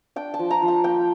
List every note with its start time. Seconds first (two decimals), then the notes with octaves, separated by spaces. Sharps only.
0.16 D4 G5
0.34 A5
0.39 F3
0.51 A#5
0.62 F3
0.68 A5
0.84 A#3 G5